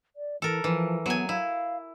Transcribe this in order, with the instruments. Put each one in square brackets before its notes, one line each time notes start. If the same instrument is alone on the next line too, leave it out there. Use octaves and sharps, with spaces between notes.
[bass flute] D5
[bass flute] E3 [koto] A4 A#4
[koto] E3 [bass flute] F3
[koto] F#3 G#5 [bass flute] B3
[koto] E4 [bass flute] F5